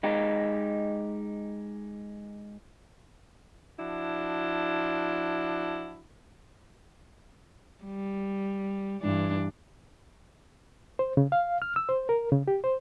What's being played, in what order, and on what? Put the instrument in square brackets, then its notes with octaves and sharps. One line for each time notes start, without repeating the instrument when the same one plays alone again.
[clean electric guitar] G#3 D#4 G4
[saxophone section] F3 D4 E4 F#4
[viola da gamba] G3
G2 E3 D4
[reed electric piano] C5
C#3
F5
F6
E6
C5
A#4
C#3
G4
C5